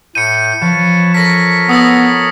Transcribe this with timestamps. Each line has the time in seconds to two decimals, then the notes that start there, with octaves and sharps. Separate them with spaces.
0.15 A2 G6 C#7 D#7
0.61 F3 B4 C#5 A5
1.14 A4 A#4 C#5 A#6 B6
1.69 B3 D#6 E6 A#6